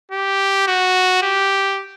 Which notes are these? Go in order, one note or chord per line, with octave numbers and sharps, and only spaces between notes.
G4
F#4
G4